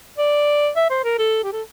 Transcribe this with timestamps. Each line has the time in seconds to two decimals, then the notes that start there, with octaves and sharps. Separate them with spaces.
0.18 D5
0.76 E5
0.90 C5
1.04 A#4
1.19 A4
1.44 G4
1.53 A4